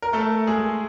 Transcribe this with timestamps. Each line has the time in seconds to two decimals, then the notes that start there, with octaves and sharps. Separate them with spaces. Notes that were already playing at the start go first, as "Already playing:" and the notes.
0.02 A#4
0.13 A3 A4
0.47 G#3 G#4